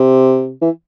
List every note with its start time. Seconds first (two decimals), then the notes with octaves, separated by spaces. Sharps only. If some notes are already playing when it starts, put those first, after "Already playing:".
Already playing: C3
0.61 E3